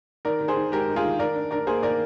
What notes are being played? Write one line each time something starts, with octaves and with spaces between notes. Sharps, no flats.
D#3 A#4 D5
D#3
G#4 C5
D#3
G#3 G4 A#4
D#4
F4 G#4
D#3
D#3 A#4 D5
D4
D4 A#4 D5
A#3 G#4 C5
D#3 A#4 D5